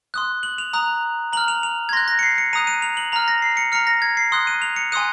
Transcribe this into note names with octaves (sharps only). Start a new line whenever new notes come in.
C6 D#6 F#6
F#7
F7
A#5 D#6 F#6
A#5 F6 F#7
F7
F7
G#6
C6 F#6 A#6
A#6
C#7
C7
C#7
A#5 D#6 F#6 D#7
D#7
F7
F#7
A#5 F6 F7
A#6
C7
C#7
A#5 F6 C#7
A#6
G#6
C7
C6 D#6 F#6
D#7
F7
C#7
G#5 C6 D#6 F#6 D#7